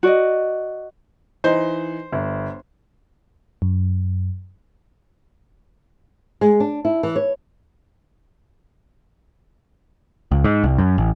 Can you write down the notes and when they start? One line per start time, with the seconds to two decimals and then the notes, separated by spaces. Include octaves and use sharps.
0.03 F#4 D5 D#5
1.44 E3 D#4 C5
2.12 G1
3.62 F#2
6.41 G#3
6.60 D4
6.85 E4
7.03 E3
7.16 C#5
10.31 C#2
10.44 G#2
10.64 C2
10.78 F#2
10.98 A1